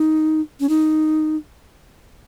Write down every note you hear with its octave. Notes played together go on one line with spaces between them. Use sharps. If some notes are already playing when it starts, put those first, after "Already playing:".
Already playing: D#4
C#4
D#4